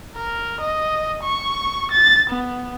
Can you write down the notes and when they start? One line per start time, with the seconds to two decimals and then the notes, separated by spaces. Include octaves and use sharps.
0.16 A#4
0.61 D#5
1.23 C#6
1.91 A6
2.30 B3